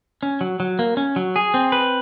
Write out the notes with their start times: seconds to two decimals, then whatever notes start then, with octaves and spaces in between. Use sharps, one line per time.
0.23 C#4
0.41 F#3
0.60 F#3
0.79 A#3
0.97 C#4
1.16 F#3
1.36 G#4
1.54 C4
1.72 B4